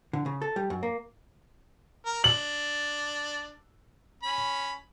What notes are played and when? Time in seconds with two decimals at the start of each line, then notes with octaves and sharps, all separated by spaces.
0.13 D3
0.26 C#3
0.42 A4
0.56 G3
0.70 F#2
0.83 A#3
2.06 A#4
2.24 D4 F#7
4.23 C#4 B5